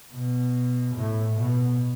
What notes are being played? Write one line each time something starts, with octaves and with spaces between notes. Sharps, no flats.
B2
A2
B2